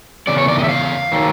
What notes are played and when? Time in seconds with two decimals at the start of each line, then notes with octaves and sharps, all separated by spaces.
0.27 E2 C#3 D5
0.38 C#5
0.48 D5
0.59 D#5
0.64 E5
0.69 F5
1.12 D#3 F#3